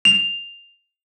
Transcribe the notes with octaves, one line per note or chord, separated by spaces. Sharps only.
F7